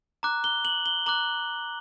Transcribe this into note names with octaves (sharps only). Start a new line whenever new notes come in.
A#5 D6 F#6
G7
F#7
G7
A#5 D6 F#6 F#7